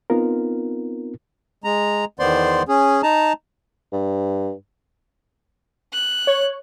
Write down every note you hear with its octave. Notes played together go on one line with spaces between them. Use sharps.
B3 C4 D#4 F4 A#4
G#3 A#5
E2 D#3 B3 C5 D5 C6
C#4 G#4
D#4 A5 A#5
G2
F#6
C#5